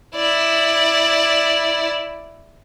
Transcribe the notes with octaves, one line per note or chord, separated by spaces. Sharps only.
E4 D5